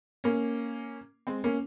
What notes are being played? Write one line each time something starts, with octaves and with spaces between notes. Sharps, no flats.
A#3 C#4
G#3 C4
A#3 C#4